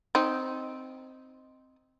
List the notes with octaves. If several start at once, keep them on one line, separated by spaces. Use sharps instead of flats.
C4 D#4